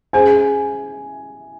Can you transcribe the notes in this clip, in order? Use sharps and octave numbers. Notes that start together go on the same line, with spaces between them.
C#4 G#4 C5 G#5